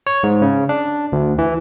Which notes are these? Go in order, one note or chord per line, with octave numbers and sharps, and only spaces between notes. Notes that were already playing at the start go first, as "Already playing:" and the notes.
C#5
G#2
C#3
D4
D2
E3